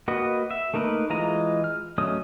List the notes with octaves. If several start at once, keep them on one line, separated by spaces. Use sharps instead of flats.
A#3 F#4 B4 D#5
E5
A3 A#3 D#4 A#4 B4
E3 G#3 F4 D#5 A#5
F6
F#3 A3 C#4 D#5 D#6